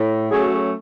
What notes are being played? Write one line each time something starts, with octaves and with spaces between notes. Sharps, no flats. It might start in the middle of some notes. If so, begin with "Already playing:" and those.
Already playing: A2
F#3 A3 C#4 G#4
F#4
G#4